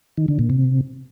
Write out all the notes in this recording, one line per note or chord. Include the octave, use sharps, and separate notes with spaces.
D#3
D3
A#2
C3